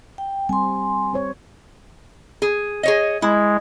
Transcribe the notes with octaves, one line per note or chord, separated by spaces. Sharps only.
G5
G3 C4 G#5 C6
C4 C5 C#5
G#4
G#4 C#5 D#5
G#3 E4